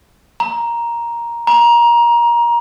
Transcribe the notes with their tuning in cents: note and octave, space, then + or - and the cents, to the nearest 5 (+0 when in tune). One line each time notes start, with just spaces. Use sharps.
A#5 +10
A#5 +20